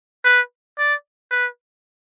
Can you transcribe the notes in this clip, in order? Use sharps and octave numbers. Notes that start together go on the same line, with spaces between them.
B4
D5
B4